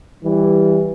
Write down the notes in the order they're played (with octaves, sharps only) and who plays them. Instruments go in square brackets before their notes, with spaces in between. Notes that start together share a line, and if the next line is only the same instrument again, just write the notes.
[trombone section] E3 G3